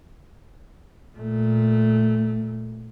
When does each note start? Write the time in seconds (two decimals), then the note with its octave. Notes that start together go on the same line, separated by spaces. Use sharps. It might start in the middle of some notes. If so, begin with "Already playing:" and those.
1.16 A#2 A3